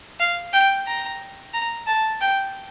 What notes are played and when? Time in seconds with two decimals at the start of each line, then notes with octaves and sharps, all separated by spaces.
0.20 F5
0.53 G5
0.87 A#5
1.54 A#5
1.87 A5
2.21 G5